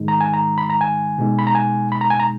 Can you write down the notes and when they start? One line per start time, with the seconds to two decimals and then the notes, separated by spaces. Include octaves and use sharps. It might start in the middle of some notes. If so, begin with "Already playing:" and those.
Already playing: G#2 D#3 G#3 D#4
0.08 A#5
0.21 G#5
0.34 A#5
0.58 B5
0.70 A#5
0.81 G#5
1.18 B2 G#3 D#4
1.39 B5
1.47 A#5
1.55 G#5
1.92 B5
2.01 A#5
2.10 G#5
2.19 A#5